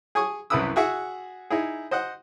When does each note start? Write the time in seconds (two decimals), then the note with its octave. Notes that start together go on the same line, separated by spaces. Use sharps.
0.15 G#4 G#5 C#6 D#6
0.50 C2 F#2 E4 B4 D#6 E6
0.76 F#4 G#4 E5 F#5
1.50 D#4 E4 G#4
1.91 C5 D#5 F#5